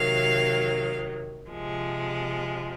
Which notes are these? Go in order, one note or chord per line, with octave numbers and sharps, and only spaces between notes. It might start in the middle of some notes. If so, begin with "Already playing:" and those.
Already playing: C3 D#3 F#3 F5
C3 F3 G#3